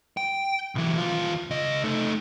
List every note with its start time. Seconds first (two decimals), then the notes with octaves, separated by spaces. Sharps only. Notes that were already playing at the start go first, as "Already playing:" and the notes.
0.17 G5
0.75 B1 E3
0.98 D#2 F4
1.50 C#2 D#5
1.84 A3 D#4